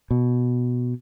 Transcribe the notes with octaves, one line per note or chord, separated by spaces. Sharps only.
B2